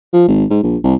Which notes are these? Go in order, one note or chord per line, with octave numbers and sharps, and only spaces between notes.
F3
G#1
G#2
A#1
C2